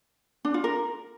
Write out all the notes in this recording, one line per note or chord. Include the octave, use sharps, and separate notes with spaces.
D4
F4
A#4